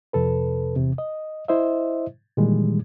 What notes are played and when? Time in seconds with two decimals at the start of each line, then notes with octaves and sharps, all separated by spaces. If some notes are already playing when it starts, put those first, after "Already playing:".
0.13 F2 C3 A4 B4
0.76 E2 C3
0.98 D#5
1.48 E4 C5 D#5 E5
2.37 A#2 D#3 E3 G3 G#3